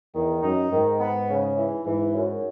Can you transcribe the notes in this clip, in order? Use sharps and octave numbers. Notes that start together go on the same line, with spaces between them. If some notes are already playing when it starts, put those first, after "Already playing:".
E2 D#3
F#2 D#4
G#2 D#3
B3
C#3
E3
G#2 E3
F#2